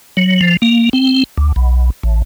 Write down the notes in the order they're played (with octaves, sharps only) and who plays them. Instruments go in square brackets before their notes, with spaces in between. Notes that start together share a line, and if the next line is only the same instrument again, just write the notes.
[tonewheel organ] F#3
F3
A#3
C4
D2
B1
A1